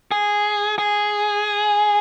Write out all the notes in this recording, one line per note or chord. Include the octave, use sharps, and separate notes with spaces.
G#4
G#4